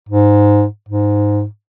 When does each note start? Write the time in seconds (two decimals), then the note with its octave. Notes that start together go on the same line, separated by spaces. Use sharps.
0.09 G#2
0.89 G#2